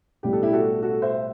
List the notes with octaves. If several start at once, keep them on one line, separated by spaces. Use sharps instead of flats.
B1 A2 G3 G4
A4
E4 G4
F#4 A4
F#4 A4
C5 E5